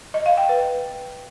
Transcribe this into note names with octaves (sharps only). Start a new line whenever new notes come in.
D#5
F5
G5
B4